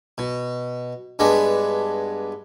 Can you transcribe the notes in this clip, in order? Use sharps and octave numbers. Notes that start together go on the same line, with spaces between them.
B2
G2 G#3 B3 D4